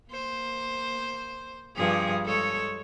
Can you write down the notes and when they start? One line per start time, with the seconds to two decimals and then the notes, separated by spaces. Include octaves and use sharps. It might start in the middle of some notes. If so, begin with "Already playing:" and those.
0.10 A#3 C5
1.76 G2 F3 G#4
2.25 G#3 A4 C#5